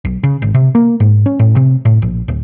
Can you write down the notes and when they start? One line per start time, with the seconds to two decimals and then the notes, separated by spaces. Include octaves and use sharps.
0.05 B1
0.23 C#3
0.42 G#1
0.54 C3
0.75 A#3
1.00 G#2
1.26 C#4
1.39 A2
1.56 C3
1.85 A2
2.02 A#1
2.28 D1